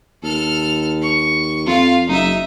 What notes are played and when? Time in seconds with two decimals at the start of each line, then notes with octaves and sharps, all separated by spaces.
0.23 D#2 A4 F6
1.02 C#6
1.67 F2 F4 F5
2.08 F#1 D#4 E5